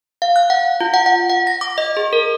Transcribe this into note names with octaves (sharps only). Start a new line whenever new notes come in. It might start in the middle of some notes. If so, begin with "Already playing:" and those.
F5
F#6
F#5
F4
F#5
F#5
F#5
A#6
D6
D#5
G#4
A#4